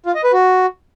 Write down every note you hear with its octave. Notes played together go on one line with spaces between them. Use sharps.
F4
D#5
B4
F#4